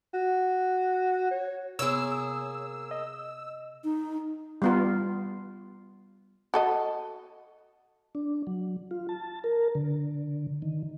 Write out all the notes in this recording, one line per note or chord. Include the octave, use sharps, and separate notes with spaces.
F#4
C#5
C3 A#3 B3 G#4 C#5 E6
D#5
D#4
G3 B3 F4
F#4 A4 D#5
D4
F#3
F4
A5
A#4
D3
D#3